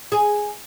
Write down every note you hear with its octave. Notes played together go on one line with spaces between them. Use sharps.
G#4